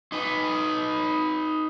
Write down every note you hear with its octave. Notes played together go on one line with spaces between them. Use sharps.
D#4 B4